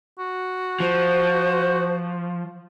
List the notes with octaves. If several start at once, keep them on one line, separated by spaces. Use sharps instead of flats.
F#4
F3 C5